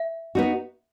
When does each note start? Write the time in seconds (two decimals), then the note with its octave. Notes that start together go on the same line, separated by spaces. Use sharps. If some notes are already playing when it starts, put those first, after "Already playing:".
Already playing: E5
0.35 B3 D#4 F#4